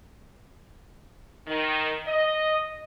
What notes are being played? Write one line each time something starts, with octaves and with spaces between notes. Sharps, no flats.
D#3
D#5